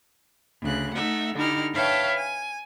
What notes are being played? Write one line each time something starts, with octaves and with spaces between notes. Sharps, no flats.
D2 C#3 F#6
A3 D#4 E5 F#5
D3 D#4 E4 G4 F6
B4 C#5 E5 F5 G5 A5
G#5